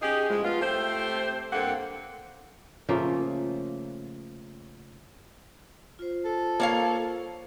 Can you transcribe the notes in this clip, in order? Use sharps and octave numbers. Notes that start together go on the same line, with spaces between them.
C#4 D#4 G4 G#4
A2 F3 G#3
F3 B3 F4
A3 C4 G4 C5
G2 A#3 C4 A4 F#5
C#3 F3 A3 A#3
F4 C5
A4
A#3 C#5 F5